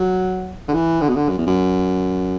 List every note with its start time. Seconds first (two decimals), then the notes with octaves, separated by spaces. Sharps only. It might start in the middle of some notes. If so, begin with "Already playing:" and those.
Already playing: F#3
0.68 D3
0.74 E3
1.01 D3
1.09 B2
1.16 D3
1.29 F#2
1.38 E2
1.46 F#2